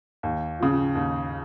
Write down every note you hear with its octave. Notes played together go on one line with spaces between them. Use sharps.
D#2
C#3 F3
D#2